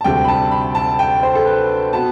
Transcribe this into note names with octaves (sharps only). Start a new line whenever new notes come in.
A5
D2 C3 G3 G5
B5
A5
B5
A5
G5
C5
A4
B4
B2 B3 A5